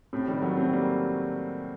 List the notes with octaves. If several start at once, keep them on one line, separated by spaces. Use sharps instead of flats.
A2 C3
D#3 G3
F#3 A3
A3 C4
G3 A#3